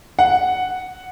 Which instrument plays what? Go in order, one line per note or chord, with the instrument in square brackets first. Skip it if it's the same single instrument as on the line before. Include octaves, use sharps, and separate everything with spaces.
[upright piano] F#5